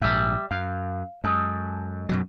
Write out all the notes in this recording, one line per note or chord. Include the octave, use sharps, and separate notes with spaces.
A#1 G#2 G3 E5
F#2 F5
F#2 G#3 A4
F#2 B2 F#3